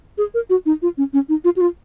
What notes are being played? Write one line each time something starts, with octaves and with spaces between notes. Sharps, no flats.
G#4
A#4
F#4
D#4
F4
C#4
C#4
D#4
F4
F#4
F4